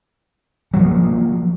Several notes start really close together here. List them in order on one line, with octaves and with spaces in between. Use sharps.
F#3 F3 A#3